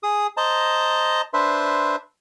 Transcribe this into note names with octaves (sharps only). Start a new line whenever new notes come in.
G#4 D#6
C5 D#5 A5 A#5
D4 B4 C5 E5 C6